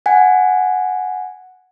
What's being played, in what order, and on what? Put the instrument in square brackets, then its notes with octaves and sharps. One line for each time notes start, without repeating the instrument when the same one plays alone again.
[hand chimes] F#5 G#5